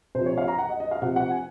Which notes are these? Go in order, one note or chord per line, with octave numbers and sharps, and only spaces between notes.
C3 F3 C5
C#5
F5
A#5
F#5
D#5
D#5
F5
C3 F3 F#5
F#5
G#5